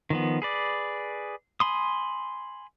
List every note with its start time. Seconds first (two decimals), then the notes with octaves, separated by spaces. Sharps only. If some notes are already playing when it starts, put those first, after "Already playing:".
0.10 D#3 F3 B3
0.42 G#4 B4 D5
1.60 G#5 B5 C6 D#6